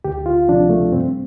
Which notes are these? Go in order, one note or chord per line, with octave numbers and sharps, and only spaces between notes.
D2 G4
F4
C3 F3 D4
A3
G2 C4